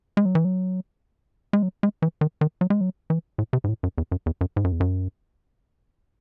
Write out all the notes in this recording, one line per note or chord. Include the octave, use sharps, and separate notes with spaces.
G#3
F#3
E3
F#3
G#3
F#3
G#3
E3
D#3
D#3
F#3
G#3
F#3
E3
A2
C3
G#2
A2
F#2
E2
F#2
E2
F#2
G#2
F#2
E2
F#2